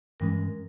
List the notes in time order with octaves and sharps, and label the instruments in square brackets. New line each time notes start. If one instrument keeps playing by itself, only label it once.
[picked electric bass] G2 E3 G#3 C#4 [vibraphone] A#4